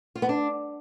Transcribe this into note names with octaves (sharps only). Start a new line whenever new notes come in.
F4
B3
D4